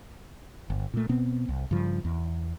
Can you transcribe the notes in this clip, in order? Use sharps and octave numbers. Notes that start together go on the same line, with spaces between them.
G1
A#2 A3
B2 B3 C4
C2
G2 C#3 F3
E2